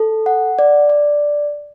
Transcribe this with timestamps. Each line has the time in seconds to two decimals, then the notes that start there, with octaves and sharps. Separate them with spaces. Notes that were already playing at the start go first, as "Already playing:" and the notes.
Already playing: A4
0.26 F#5
0.59 D5
0.89 D5